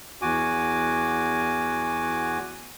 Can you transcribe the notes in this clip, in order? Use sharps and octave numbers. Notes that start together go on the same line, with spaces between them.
E2 F#4 G#5 D6